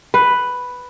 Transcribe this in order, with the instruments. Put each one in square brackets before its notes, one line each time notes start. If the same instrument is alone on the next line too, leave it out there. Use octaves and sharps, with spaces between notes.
[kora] B4